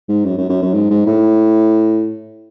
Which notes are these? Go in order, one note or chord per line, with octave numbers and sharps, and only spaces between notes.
G#2
F#2
F#2
F#2
F#2
G#2
G#2
A2